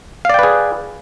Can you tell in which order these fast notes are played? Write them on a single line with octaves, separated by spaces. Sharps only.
F5 D5 G5 B4 G#4